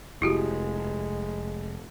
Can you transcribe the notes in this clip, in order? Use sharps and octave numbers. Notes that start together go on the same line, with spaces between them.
F1 G#3 E4 F#4 G4